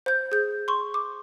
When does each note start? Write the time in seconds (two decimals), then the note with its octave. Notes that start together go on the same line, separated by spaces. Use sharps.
0.06 C5 G6
0.32 G#4 G6
0.68 C6 C#6
0.94 D6